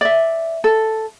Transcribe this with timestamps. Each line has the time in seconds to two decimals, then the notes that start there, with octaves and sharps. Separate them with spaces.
0.01 D5 E5
0.64 A4